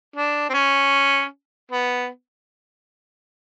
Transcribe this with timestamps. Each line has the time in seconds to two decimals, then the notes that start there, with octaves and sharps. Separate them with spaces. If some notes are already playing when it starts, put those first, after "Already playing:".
0.16 D4
0.49 C4
0.54 C#4
1.72 B3